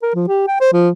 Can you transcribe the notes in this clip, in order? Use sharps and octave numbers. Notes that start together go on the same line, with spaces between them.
A#4
F3
G4
G5
C5
F3